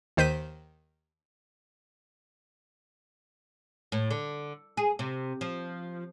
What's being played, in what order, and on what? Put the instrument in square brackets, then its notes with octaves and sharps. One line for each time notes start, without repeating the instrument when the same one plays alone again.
[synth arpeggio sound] D#2 D#3 C5 G6 B6 D#7
[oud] A2
D3
G#4
C3
F3